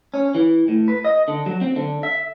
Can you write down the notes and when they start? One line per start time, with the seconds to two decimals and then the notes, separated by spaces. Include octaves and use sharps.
0.14 C#4
0.35 E3
0.68 A2
0.88 B4
1.05 D#5
1.28 D3
1.46 F#3
1.61 C4
1.76 D3
2.03 E5